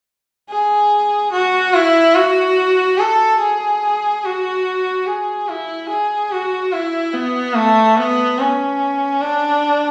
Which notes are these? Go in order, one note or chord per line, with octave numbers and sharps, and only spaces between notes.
G#4
F#4
E4
F#4
A4
G#4
F#4
G#4
E4
G#4
F#4
E4
B3
A3
B3
C#4
D4